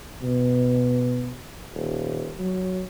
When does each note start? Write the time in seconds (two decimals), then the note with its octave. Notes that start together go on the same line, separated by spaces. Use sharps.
0.22 B2
1.74 D#1
2.39 F#3